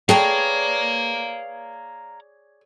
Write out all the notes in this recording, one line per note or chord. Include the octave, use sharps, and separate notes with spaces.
G#4 B4 C#5 D5 F5 G5 A5 A#5